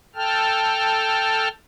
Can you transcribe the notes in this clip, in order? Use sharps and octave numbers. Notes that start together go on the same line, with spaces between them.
A4 G5 A5 F6